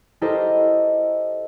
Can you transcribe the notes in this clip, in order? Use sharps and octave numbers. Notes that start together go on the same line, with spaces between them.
E4 G4 A4 A#4 C5 D#5